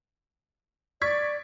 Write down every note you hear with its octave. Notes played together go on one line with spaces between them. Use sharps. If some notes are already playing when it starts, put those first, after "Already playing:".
D5 C#6 G#6 B6